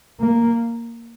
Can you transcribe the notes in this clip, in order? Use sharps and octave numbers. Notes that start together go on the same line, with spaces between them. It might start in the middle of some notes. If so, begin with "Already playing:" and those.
A#3